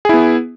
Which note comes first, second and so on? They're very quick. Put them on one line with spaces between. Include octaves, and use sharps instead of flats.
G#4 E4 B3